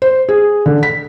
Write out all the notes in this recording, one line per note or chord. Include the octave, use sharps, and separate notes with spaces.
C5
G#4
D3
B6